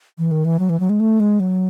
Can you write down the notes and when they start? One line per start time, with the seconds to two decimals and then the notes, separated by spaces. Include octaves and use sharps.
0.18 E3
0.31 D#3
0.45 E3
0.59 F#3
0.69 E3
0.80 F#3
0.89 G#3
1.00 A3
1.20 G#3
1.40 F#3